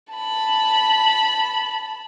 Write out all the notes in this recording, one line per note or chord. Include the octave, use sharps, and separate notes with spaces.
A5 B5